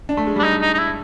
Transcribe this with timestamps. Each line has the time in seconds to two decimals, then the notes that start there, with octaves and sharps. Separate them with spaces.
0.09 D4
0.17 A3
0.27 G#3
0.36 G3 D4
0.44 D#4
0.62 D#4
0.74 D#4
0.78 E4